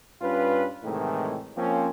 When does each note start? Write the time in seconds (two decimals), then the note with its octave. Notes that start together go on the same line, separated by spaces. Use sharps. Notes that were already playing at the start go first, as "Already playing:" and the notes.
0.22 G2 C#4 F4 B4
0.84 A2 C3 D#3 E3 G#3 A3
1.56 F3 A#3 C4 C#4